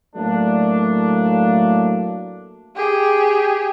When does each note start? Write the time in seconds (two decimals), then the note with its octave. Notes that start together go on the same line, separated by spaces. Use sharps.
0.16 A2 F#3 A3 A#3 D4
2.76 G4 G#4